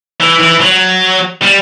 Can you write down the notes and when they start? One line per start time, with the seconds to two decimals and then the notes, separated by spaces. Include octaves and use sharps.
0.20 E3
0.40 E3
0.60 F#3
1.42 G3